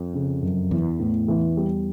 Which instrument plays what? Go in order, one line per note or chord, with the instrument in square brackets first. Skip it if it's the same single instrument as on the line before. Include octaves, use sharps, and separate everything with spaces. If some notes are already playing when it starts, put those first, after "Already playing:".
Already playing: [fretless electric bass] F2
[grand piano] C#3
F#2
[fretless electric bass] E2 [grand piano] E3
[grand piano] A2
E3
G3